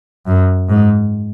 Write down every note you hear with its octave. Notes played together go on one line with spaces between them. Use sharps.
F#2
G#2